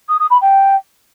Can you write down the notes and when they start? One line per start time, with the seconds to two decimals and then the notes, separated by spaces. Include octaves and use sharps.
0.08 D#6
0.19 D#6
0.30 B5
0.41 G5